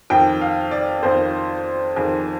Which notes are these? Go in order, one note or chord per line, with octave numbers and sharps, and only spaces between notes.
F2 D#3 G5
F5
D5
F2 D#3 C5
F2 D#3 G#4